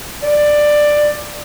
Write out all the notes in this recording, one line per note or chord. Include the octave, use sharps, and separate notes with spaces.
D5